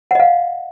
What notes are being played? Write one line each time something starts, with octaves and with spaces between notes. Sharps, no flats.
D#5 F5 F#5